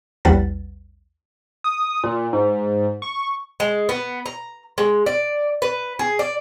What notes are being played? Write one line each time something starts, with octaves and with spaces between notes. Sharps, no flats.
A#1 E2 G3 B4 F#5 A6
D#6
A#2
G#2
C#6
G#3
B3
A#5
G#3
D5
B4
G#4
D5